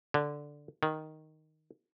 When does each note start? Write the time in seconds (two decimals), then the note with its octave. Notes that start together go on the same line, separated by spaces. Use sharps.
0.14 D3
0.83 D#3